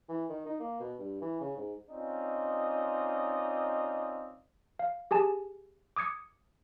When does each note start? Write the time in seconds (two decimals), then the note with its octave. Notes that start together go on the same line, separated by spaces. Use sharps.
0.09 E3
0.30 D#3
0.46 D#4
0.60 A#3
0.80 B2
0.99 G2
1.22 E3
1.41 C#3
1.57 G#2
1.89 C4 C#4 D#4 F4 D5 D#5
4.79 F5
5.11 G4 G#4 G#5 A5
5.96 D6 D#6 G#6 C#7